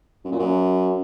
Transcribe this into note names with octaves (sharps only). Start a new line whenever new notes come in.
F#2
A#2
F#2